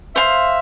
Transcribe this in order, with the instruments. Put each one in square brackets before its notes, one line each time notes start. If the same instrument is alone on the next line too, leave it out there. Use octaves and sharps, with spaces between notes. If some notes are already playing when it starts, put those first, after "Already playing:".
[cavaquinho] C5 F5 C6 [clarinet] E5